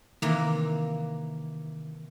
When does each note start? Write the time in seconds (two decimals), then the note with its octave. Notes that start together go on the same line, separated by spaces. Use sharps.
0.22 C3 D#3 E3 A#3